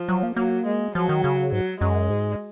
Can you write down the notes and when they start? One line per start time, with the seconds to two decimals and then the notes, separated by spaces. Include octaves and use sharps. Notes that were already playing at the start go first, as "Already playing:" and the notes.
Already playing: F3
0.09 F#3
0.23 A#3
0.36 F#3 A#3
0.66 G#3
0.95 F3 F#3
1.09 D#3
1.24 C#3
1.52 G#2 F#3
1.81 F#2 G#3
2.10 G#2